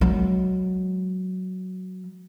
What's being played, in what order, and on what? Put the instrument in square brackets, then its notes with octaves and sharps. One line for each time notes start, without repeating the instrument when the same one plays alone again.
[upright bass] F#3 G#3